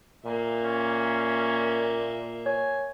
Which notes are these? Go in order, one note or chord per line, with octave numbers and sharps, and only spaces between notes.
A#2 A#3 E5
C#4
C#5 G#5